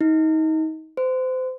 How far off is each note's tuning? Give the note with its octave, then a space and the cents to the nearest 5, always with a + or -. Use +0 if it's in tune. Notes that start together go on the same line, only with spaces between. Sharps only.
D#4 +25
C5 -30